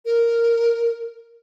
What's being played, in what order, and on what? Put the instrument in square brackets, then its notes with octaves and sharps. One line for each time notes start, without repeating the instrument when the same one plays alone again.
[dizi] A#4